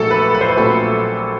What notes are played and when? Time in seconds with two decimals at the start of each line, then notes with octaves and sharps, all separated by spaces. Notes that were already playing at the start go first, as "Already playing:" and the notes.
Already playing: A#1 A#2 F#3 A3 A4
0.11 B4
0.34 B4
0.41 C5
0.49 B4
0.57 A#1 A#2 F#3 A3 A4